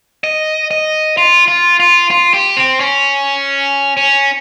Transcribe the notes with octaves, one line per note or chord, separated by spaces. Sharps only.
D#5
D#5
F4
F4
F4
F4
G4
C4
C#4
C#4